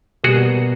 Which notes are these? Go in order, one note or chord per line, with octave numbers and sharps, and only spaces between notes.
B2 G3 A#3 F#4 G#4